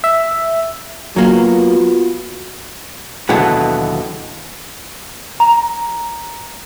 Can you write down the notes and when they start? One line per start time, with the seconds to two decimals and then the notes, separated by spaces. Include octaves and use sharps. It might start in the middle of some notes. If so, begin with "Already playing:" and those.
0.04 E5
1.16 F#3 A#3 B3 F4 F#4
3.29 D#2 B2 D3 E3 F#3 B3
5.40 A#5